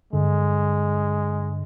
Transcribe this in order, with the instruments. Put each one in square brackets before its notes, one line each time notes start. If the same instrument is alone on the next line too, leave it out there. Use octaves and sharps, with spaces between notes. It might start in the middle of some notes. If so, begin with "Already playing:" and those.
[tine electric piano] G2 D3 [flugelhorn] G#3